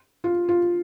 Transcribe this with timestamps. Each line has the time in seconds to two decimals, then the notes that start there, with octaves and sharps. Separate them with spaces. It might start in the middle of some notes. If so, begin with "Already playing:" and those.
0.24 F4
0.49 F4